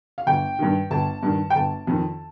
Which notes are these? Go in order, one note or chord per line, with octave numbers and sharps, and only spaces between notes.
F5
G1 G5
G2 D#3
G1 A5
G2 D#3
G5
G1 A5
F2 D#3